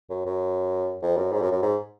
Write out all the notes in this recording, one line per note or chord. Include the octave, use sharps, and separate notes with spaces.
F#2
F#2
F2
F#2
G#2
F#2
F#2
G#2